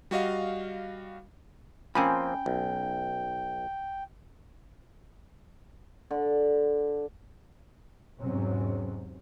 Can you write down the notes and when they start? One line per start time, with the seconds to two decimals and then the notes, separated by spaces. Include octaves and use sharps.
0.11 G3 F#4 D#5 F5
1.95 F3 A#3 C4 C#4 G5 G#5 B5
2.46 B1
6.11 D3
8.21 E2 G#2 C3 F#3 C4 C#4